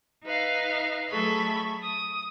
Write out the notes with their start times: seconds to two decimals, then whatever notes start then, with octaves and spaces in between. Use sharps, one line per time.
0.25 D#4 B4 E5 F5
1.11 F#3 A3 G#4 A4 B5 C#6
1.81 D#6